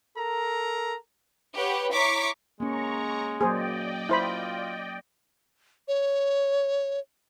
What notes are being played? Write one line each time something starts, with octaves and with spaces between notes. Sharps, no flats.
A4 A#4 A#5
G4 B4 C#5 F#5
E4 C#5 A#5 C#6 D6 B6
G#3 A#3 C#4 A#5 C#6
F#3 A#3 G#4 C5 D5 D#5 G5
E4 F4 C5 B5
C#5